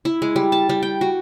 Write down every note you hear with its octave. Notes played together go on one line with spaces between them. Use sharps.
E4
G#3
G3
A5
G3
G5
F#4